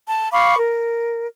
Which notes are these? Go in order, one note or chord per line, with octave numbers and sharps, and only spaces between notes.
A5
F5 B5 C#6 D6
A#4